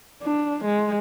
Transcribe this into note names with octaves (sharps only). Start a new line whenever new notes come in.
D4
G#3